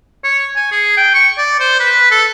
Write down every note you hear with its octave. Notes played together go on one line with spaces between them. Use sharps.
C#5
G#5
G#4
G5
C#6
D5
C5
B4
A4